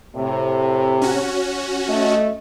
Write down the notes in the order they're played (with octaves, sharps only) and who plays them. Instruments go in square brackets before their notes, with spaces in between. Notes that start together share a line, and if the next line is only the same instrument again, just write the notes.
[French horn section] A2 C3
[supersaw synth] C#4 F#4
[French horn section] A3 D#5